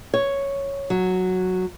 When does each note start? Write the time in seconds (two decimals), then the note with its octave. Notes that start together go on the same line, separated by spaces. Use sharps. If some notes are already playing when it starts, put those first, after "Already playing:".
0.14 C#5
0.90 F#3